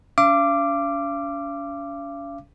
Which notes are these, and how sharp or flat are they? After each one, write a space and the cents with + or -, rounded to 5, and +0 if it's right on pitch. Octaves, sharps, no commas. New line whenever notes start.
C#4 +45 F5 -40 D6 +0